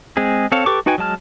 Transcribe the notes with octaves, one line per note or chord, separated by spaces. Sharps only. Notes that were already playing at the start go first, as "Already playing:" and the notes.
G#3 C4 G#4
C4 A4 C#5 F5
G4 A4 B4 C#6 D6
D#4 F#4 B4 G5 G#5
F#3 G#3 A5 F6